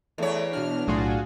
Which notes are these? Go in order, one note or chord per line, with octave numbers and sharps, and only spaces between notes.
E2 A3 C#5
B2 D4 F6
B1 A2 F4 F#4 G#4